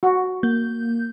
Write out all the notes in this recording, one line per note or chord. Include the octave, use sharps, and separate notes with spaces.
F#4
A#3 G6